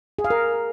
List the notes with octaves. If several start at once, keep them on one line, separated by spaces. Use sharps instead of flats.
G#4
F5
A#4